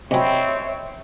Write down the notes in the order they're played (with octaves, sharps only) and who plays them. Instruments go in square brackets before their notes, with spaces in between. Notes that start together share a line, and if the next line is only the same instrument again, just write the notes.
[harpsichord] C3 F#3 [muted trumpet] C4 [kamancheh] C#5 E5 [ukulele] D#5 G5 B5